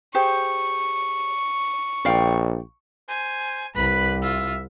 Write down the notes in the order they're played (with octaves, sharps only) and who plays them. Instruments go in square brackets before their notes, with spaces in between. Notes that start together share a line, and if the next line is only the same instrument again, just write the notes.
[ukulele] G4 G#4 C5 [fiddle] C#6
[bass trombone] A#1 [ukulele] D5 F5 G5
[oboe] C5 [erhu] G#5
[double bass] C2 [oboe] B4 [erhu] B5
[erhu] F4 [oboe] E5